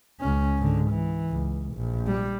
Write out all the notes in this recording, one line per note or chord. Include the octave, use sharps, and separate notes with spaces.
C#2 C#4
G#2 D3
E3
C#2
A#1
G3